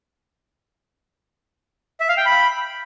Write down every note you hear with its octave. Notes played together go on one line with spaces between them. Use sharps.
E5
F5
G5
B5